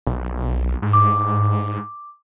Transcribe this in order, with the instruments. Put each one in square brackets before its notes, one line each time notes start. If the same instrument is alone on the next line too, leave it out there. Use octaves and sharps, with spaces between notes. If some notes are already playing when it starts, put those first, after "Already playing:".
[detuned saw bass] B1
G#2
[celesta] D6